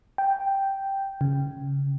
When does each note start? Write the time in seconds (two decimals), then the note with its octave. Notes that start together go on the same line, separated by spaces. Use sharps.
0.18 G5
1.21 C#3